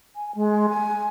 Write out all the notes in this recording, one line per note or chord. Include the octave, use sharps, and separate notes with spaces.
G#5
G#3
G#5